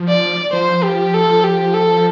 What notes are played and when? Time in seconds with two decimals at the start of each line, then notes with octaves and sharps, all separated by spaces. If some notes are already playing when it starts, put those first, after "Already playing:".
Already playing: F3
0.09 D5
0.53 F3 C5
0.83 G4
1.14 A4
1.43 G4
1.73 A4